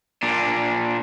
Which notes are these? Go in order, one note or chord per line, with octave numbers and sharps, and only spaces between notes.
A#2 D4